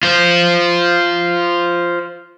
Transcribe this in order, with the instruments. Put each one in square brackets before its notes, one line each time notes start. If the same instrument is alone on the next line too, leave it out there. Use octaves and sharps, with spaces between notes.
[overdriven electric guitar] F4 C5